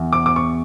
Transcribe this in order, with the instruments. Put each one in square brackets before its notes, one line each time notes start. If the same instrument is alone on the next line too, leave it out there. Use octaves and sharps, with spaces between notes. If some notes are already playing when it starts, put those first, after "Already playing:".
Already playing: [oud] E2
[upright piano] D6
D6
C#6